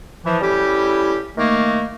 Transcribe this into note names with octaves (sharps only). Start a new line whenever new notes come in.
E3 F3
A2 G3 C#4 E4 G4
D#3 A3 A#3